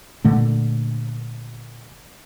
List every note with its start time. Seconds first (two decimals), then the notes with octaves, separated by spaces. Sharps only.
0.24 A#2 D3 A3